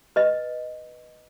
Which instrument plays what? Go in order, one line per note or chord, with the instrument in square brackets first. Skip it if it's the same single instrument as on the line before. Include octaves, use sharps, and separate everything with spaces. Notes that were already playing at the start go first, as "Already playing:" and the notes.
[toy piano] B4 D#5